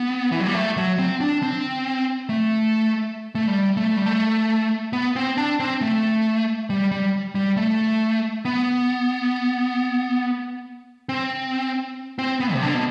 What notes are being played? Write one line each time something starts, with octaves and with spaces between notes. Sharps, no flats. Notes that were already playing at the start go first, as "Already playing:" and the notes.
Already playing: B3
E3
F#3
G3
A3
F#3
C4
D4
C4
A3
A3
G3
A3
G3
A3
B3
C4
D4
C4
A3
G3
G3
G3
A3
B3
C4
C4
B3
C3
D3
B2